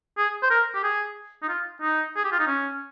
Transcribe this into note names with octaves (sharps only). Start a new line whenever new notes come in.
G#4
C5
A#4
G4
G#4
D#4
F4
D#4
G#4
G4
F4
D#4
C#4